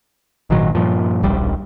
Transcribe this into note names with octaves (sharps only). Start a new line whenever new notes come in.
G#1 A#2 D#3 F#3
G2 A#2 F3
D1 A#1 G3